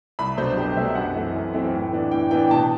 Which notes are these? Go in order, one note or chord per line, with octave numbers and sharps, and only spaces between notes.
C2 B5
B2 F#3 A3 D4 C5
C2 G4
B2 F#3 A3 D4 E5
F#2 F#5
E3 A3 C4
F#2
E3 A3 C4
A2
E3 B3 D4
A2 G5
E3 B3 D4 G5
B2 A5